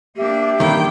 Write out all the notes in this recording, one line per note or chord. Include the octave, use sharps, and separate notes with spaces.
A#3 D4 G4 E5
G2 D#3 E3 A#3 C#4 E4 G5